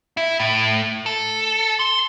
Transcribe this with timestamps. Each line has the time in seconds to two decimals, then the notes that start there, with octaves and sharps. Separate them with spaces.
0.17 E4
0.39 A2
1.06 A4
1.79 C6